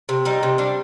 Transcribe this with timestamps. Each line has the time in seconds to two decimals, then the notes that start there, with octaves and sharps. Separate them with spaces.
0.09 C3
0.25 G3 D#4
0.43 C3
0.58 G3 D4